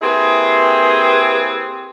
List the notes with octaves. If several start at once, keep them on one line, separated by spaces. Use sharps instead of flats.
A#3 C4 E4 G4 G#4 B4